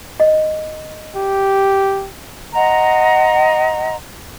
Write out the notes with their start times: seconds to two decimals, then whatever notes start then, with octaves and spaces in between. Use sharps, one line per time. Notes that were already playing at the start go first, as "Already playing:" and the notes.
0.20 D#5
1.16 G4
2.54 D#5 F#5 A#5 C6